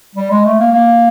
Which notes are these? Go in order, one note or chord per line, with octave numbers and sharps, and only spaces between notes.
G3
G#3
A3
A#3
A#3